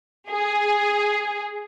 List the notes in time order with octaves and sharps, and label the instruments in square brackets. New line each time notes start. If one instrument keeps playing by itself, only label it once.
[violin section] G#4